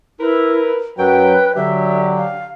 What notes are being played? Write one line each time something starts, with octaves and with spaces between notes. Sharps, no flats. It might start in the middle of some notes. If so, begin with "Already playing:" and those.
E4 A#4 B4
F#2 F#3 B4 G5
D3 F#3 D4 G4 E5
F5